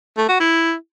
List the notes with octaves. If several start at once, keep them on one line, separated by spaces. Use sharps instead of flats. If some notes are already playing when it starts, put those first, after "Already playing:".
A3
F#4
E4